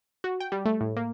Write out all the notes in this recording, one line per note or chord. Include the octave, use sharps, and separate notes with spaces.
F#4
G5
G3
A3
A2
A#3